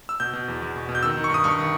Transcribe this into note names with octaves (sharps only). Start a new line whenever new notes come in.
E6
B2 G6
B2
E2
E2
B2
B2
G6
D#3 E6
D#3
C#6
G2 D#6
G2 C#6
D#3